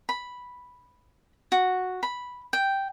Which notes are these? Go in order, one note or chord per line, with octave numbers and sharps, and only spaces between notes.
B5
F#4
B5
G5